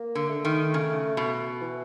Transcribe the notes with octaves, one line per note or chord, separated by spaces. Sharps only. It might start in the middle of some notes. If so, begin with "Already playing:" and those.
Already playing: A#3
D3
A3
D#3
C#3
B2
E3